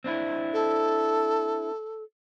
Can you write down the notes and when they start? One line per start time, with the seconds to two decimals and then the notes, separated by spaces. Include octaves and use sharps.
0.04 C4 D4 E4
0.53 A4